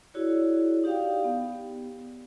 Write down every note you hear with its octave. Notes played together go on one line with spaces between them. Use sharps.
E4 F#4 G#4 C#5 D5
D#4 G4 D5 F5 G5
B3